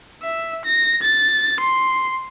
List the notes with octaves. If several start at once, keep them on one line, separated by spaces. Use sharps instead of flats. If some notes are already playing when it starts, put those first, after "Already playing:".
E5
A#6
A6
C6